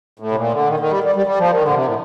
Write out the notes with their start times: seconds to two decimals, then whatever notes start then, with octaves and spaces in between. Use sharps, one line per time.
0.19 A2
0.32 C3
0.36 A#2
0.52 D3
0.68 D#3
0.79 D#3
0.90 G3
1.04 G3
1.15 G3
1.26 G3
1.39 F3
1.51 D#3
1.62 D3
1.68 A#2
1.74 C3
1.86 A2